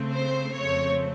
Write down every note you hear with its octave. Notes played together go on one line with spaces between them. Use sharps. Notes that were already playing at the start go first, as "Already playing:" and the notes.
Already playing: C#3 A3 C4
C5
F2 C#3 A3 C4 C#5